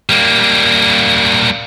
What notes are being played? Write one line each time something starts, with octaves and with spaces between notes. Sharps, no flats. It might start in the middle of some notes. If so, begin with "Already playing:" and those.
G3 A#3